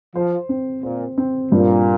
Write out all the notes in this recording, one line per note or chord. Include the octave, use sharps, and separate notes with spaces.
F3 C5
C4
A#2 C5
C4
G2 A#2